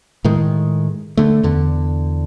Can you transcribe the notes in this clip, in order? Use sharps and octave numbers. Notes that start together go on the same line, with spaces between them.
A2 D#3 G#3
D3 A3
E2 D3